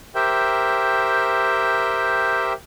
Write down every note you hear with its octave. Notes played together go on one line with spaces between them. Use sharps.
G4 A#4 C5 E5 G5